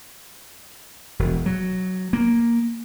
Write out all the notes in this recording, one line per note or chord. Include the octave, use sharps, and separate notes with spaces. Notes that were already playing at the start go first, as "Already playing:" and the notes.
E1
F#3
A#3